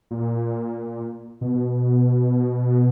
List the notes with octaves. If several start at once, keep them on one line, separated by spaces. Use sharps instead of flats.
A#2
B2